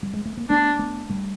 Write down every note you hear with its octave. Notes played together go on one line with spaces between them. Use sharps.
G3
G#3
A3
A#3
A3 B3 D4
A3 B3
G3 A3